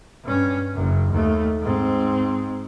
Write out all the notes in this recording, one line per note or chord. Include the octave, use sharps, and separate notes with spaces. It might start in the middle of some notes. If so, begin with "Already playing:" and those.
G2 C#4
F#1 F#2
D#2 A3
G#2 C4